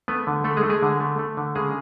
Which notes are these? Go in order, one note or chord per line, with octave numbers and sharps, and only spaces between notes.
A3 B3 B4
D3
A3 A4
G#3 G#4
A3
G#3 G#4
D3
A3
A3
D3
C#3 G#3 G#4